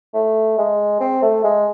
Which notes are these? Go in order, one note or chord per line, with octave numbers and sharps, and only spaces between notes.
A3
G#3
C4
A3
G#3